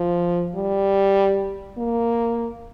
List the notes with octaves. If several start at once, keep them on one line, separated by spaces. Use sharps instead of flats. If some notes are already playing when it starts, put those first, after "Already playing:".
Already playing: F3
G3
A#3